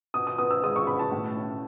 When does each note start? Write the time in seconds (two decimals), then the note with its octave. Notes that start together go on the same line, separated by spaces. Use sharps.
0.14 B2 D#6
0.27 D#6
0.38 B3 D#6
0.51 E6
0.63 G#3 D#6
0.76 C#6
0.87 B2 B5
0.99 A5
1.12 A2
1.37 C#4